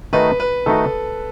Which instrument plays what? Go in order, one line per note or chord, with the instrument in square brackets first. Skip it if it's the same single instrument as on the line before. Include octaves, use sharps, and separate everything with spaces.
[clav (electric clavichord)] D#3 A3 D#4 F#4 [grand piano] B4
[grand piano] B4
[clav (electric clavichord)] D#3 A3 D#4 F#4 [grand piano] A4